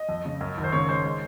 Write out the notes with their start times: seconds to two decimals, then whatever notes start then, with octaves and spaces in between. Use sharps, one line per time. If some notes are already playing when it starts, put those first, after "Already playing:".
Already playing: D#5
0.09 F2
0.25 C#3
0.41 F#2
0.57 G#1
0.64 C5
0.72 C#3 C#5
0.89 G#3 C5
1.04 G#3